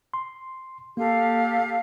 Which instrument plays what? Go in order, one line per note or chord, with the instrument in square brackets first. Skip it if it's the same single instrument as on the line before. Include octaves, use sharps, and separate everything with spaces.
[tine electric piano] C6
[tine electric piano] A#3 [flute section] G4 A4 F5